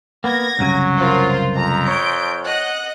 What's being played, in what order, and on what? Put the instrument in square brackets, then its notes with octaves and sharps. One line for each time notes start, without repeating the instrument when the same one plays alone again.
[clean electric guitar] A#3 B3 [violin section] G#6 A#6
[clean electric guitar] C2 F#2 C#3 [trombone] F#3
[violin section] F4 A#4 C5
[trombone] F2 [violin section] A#5
[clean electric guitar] C#5 [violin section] G6 D7
[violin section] D#5 F#5 F#6